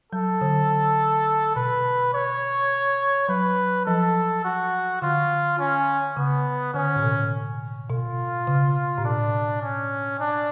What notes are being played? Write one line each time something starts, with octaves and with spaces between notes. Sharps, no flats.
F#3 A4
D3
B2 B4
C#5
F#3 B4
F3 A4
F#4
D3 F4
C#4
C#3 B3
D3 C#4
A2
B2
B2 F4
C#3
A2
B2 D4
C#4
D4